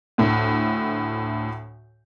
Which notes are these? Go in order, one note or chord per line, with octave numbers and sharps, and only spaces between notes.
D2 A2